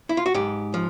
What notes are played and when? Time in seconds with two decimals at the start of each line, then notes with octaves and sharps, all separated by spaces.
0.09 E4
0.17 F4
0.26 F#4
0.34 G#2 G4
0.74 F3